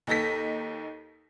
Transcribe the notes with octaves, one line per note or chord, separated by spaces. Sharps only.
D#2 D#4 A4 A#6 B6